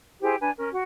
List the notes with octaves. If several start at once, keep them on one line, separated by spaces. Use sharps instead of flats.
E4 G4 G#4 C5
D4 B4 G#5
C#4 A#4
F#4